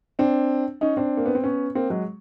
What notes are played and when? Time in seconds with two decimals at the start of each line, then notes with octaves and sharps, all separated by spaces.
0.19 C4 D4
0.81 C#4 D#4
0.97 C4 D4
1.17 A#3
1.26 B3
1.35 C4
1.43 B3 C#4
1.75 A#3 C4
1.90 F#3 G#3